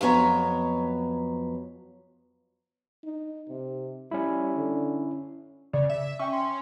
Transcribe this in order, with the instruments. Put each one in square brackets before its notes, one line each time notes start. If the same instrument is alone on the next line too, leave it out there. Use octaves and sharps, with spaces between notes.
[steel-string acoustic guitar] F2 F#3 B3 C#5 A#5
[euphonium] D#4
C3
[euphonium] G3 [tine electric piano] C#4 E4
[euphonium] D3
[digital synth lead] C#3 [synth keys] D5
[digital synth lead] E5
[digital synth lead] C#4 [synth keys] E5 G5 C#6
[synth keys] C6